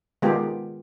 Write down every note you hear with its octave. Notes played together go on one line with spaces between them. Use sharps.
D#3 G#3 B3 F4 G4